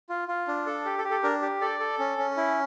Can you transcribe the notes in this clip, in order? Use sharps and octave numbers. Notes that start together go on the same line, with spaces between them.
F4
F4
D4
A4
G4
A4
G4
A4
D4 A#4
G4
A4 D5
A4
C#4
C#4
E4